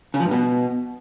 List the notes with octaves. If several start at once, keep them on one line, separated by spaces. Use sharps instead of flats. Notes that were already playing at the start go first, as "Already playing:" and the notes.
C#3
F3
G2
B2